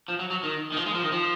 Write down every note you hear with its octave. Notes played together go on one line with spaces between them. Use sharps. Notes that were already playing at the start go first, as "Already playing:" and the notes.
F3
F#3
F#3
D#3
D#3
F3
G#3
F3
D#3
F3